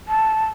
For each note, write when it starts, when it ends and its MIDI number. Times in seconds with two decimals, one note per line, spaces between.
0.08 0.46 81